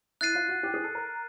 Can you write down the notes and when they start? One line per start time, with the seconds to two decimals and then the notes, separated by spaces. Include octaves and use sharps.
0.21 E4 F#6 A6 C7 D#7
0.35 F4
0.48 F#4
0.63 G4
0.74 G#4
0.84 A4
0.95 A#4